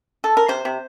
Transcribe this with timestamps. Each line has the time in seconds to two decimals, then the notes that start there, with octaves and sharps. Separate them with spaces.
0.24 A4
0.37 A#4
0.48 C3 C5
0.65 C3